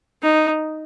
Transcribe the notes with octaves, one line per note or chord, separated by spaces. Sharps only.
D#4